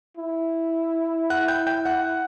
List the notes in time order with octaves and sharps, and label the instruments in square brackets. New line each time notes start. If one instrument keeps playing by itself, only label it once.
[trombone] E4
[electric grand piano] F#5 F#6
G5 G6
G5 G6
F#5 F#6